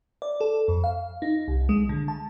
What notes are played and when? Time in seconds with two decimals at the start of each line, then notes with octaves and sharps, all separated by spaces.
0.22 D5
0.41 A4
0.68 F2
0.84 F5
1.22 D#4
1.48 C2
1.69 G#3
1.89 D3
2.08 A5